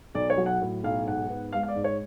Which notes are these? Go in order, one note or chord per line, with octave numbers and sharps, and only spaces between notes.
B1 D5
C#5
F#3
F#5
A2
B1 F5
G#2 F#5
B3
G#3 F5
F5
D5
G#2
C#5